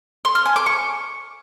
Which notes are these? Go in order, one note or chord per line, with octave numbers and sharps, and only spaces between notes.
C6
F6
G#5
D6
C#6